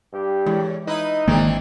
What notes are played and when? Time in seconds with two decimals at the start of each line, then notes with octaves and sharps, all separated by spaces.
0.13 G2 G4
0.46 E2 A2 E3 G#3
0.87 D#4 E4 B4 D#5
1.28 G#1 D#3 E3 G#3 A#3 C4 D4